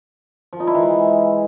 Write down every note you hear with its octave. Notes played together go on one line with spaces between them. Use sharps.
F3
D#4
E4
E3
G#3